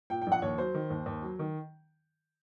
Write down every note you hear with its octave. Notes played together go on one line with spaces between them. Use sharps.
A#2 G5
G5
A#1 F#5
D#2 C#5
F#3 C5
D#3
D#2
D#2
F#3
D#3